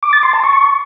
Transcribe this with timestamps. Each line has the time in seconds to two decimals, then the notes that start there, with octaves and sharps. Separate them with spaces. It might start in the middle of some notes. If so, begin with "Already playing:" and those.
0.03 D6
0.13 A6
0.23 C6
0.33 A5
0.44 C#6